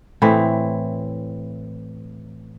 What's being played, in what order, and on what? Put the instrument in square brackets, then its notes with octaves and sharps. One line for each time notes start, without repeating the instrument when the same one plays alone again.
[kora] A2 E3 C4 E4